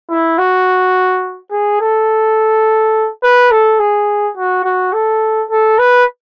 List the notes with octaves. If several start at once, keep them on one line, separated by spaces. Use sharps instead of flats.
E4
F#4
G#4
A4
B4
A4
G#4
F#4
F#4
A4
A4
B4